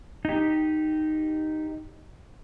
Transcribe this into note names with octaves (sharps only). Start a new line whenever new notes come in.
D#4 G4